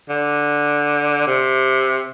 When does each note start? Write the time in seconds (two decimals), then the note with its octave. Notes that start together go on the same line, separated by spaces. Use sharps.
0.09 D3
1.27 C3